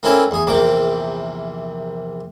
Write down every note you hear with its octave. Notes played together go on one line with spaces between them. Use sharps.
A#3 C4 C#4 E4 A4 B4
E2 G#4
A#1 E2 C3 A#3 D6